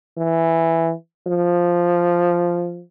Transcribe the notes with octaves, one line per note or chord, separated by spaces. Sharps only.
E3
F3